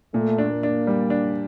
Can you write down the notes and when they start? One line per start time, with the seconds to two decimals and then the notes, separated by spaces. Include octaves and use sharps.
0.14 A#2 A3
0.38 D4
0.50 A#3
0.63 D4
0.87 G3
1.10 D4